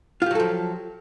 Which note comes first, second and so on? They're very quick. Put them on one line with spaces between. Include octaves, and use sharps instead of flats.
F4 G4 F#3 A4 F3